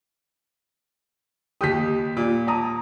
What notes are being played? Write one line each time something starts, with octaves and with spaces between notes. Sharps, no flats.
D#2 G4 D#6 G6 B6
A#2
A5 A#5 D#6